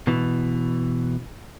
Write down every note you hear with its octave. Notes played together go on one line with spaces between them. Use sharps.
B2 E3